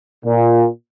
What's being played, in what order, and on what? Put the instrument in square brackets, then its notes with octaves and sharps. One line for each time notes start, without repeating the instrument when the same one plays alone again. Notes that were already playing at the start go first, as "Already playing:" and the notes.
[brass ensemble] A#2